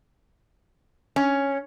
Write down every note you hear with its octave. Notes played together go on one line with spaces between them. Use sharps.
C#4